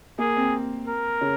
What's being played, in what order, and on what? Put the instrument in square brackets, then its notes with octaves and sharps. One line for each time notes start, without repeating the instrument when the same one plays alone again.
[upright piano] A#3 [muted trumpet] G#4
[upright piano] C4
[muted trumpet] A#4
[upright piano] C#3 C#4